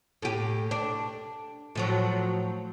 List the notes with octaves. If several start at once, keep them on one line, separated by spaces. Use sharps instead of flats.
A2 G4
D4
A2 F3 F#3